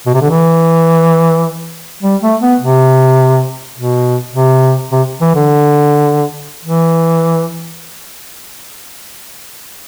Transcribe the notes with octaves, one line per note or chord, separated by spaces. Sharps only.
B2
C3
D3
E3
G3
A3
B3
C3
B2
C3
C3
E3
D3
E3